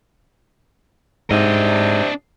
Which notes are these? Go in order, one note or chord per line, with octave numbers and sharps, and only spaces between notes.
G#2 C3 D4 D#5